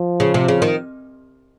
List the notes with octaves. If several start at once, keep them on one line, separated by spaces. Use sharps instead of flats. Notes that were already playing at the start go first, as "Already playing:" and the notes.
Already playing: F3
C#3
C3
C#3
D#3